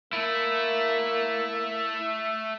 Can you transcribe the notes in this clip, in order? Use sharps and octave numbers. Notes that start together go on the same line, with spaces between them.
A3 A#3 E4 E5